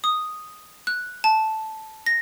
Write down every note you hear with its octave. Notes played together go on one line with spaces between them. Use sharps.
D#6
F#6
A5
A#6